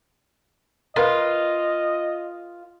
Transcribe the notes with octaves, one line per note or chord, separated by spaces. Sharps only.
F4 A#4 B4 D#5 F5